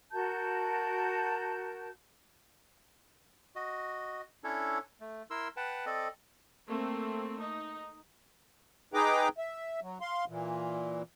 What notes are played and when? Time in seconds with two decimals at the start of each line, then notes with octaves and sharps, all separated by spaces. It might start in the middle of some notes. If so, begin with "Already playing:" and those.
0.12 F#4 A#4 A5 G6
3.56 F#4 D#5
4.44 C#4 D4 E4 A4 C#5
5.01 A3
5.31 E4 A#4 C6 E6
5.57 B4 F#5 G5 A5
5.86 C4 A4 D5 D#5
6.68 A3 A#3 C4
7.39 D#4
8.94 D#4 G#4 B4 G5 A#5 D6
9.38 E5
9.82 F#3
10.01 F5 C6
10.28 A#2 E3